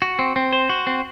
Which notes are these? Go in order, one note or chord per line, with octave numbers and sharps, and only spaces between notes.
F#4
C4
C4
C5
F#4
C4